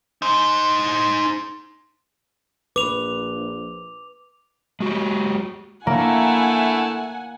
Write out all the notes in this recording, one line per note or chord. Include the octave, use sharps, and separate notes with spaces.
D#4 C5
A#1 B4 D6 F7
G#3 F#4 G4
D3 A3 A#3 E4 F#5 G#5